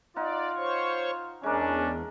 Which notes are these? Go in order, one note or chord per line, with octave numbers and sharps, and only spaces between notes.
D#4 F4 D5 F#5
C5 C#5 C#6
E2 G#3 C#4 D4 A#4